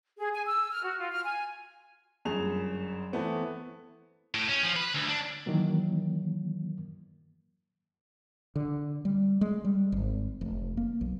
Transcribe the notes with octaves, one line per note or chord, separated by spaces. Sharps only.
G#4
G#5
E6
F6
F#4
F4
F6
G#5
G1 F#2 G#4 F7
E3 A3 B3 C4
A2
C#4
F3
B4
D2
D4
D#3 E3 F#3 A#3
D3
G3
G#3
G3
G#1
F1
A#3
B1